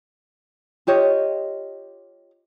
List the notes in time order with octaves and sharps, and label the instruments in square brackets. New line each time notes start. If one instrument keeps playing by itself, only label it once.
[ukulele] F4 G4 C#5 D#5